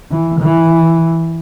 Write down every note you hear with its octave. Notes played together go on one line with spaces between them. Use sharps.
E3
E3